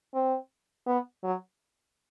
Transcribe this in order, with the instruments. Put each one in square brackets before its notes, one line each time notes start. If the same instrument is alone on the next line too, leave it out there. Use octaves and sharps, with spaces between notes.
[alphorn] C4
B3
F#3